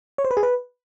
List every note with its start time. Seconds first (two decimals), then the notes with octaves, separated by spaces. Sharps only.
0.18 C#5
0.25 C5
0.31 B4
0.37 G#4
0.43 B4